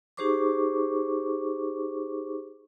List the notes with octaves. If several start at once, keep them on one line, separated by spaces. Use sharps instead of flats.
D#4 G4 G#4 C5 C#6 D6